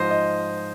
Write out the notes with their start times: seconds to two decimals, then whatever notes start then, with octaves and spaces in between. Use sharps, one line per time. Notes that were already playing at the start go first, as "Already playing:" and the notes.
Already playing: G#2 F3 C5 D#5
0.11 D#5